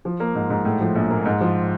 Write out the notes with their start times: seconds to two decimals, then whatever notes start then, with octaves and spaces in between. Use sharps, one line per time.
0.05 F3
0.20 A#3
0.35 G#2
0.50 G#2
0.65 A2
0.80 F3
0.95 A#1
1.11 A#3
1.25 G#2
1.41 F3